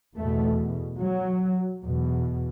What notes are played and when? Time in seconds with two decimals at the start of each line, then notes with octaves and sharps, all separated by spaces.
0.16 E2 B2 A3
1.00 F#3
1.83 E2 B2